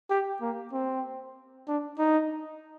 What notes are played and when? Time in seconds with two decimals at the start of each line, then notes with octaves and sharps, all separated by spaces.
0.10 G4
0.41 A#3
0.73 C4
1.68 D4
1.99 D#4